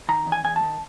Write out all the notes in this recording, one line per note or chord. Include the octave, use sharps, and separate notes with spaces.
D#3 A#5
E2
G#5
E2 G#5
A5
D#3